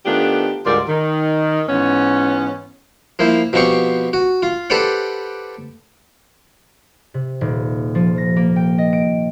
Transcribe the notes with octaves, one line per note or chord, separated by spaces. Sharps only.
D#3 A3 B3 D4 F4 G4
D2 G#2 G3 F4 A#4 D5
D#3
G#2 E3 B3 C#4
F3 A#3 E4 C5
B2 F3 B3 C4 G4 C#6
F#4
F4
G4 A4 B4 C5 D5 F#5
C3
D#1
F3
A#6
A#3
G5
D#5
D7